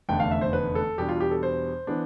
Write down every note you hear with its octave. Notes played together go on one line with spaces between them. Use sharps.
F1 E2 D3 A3 G5
F5
E5
C5
B4
A4
E2 B2 G3 D4 G4
F4
G4
A4
C5
E3 B3 D4